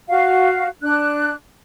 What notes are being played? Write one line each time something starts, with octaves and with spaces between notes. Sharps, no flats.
F#4 F5
D4 F#6